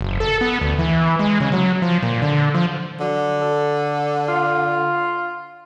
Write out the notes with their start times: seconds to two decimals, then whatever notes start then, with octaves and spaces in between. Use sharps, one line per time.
0.01 F#1
0.20 A4
0.41 B3
0.61 D2
0.79 E3
1.19 G#3
1.40 C#3
1.52 F#3
1.82 F3
2.03 A#2
2.22 D3
2.55 F3
3.00 D3 F#3
3.41 A4
4.28 F4